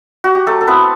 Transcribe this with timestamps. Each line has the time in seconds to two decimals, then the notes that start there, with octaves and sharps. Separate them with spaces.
0.24 F#4
0.35 G4
0.46 F#3 A3 A4
0.61 A4
0.67 B3 C4 E4 B4